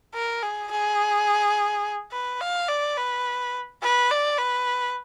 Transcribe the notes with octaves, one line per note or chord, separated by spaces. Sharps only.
A#4
G#4
G#4
B4
F5
D5
B4
B4
D5
B4